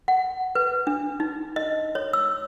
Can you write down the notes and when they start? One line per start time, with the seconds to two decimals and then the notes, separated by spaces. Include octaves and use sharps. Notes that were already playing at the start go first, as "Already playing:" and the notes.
0.08 F#5
0.55 B4
0.87 D4
1.20 D#4
1.56 D#5
1.95 C#5
2.13 E6